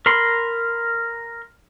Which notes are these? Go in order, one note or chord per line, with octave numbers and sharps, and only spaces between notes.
A#4 B5 C6